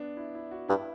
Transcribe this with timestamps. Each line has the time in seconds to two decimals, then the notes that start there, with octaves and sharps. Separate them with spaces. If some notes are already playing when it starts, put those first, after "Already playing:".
Already playing: B3 D4
0.17 E4
0.35 E4
0.51 F#4
0.68 G2 E4